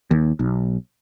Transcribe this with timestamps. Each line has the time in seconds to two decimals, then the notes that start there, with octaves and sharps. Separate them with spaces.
0.11 D#2
0.39 B1